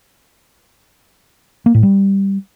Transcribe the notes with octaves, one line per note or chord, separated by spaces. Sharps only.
A#3
A2
G3